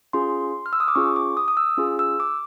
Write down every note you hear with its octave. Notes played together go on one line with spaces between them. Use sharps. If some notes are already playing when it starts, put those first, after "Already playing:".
C#4 F4 G#4 C6
F6
E6
D#6
D6
C#4 F4 G#4 C#6
D6
D#6
D#6
E6
C#4 F4 G#4
E6
D6